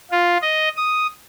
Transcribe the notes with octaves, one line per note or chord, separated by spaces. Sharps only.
F4
D#5
D#6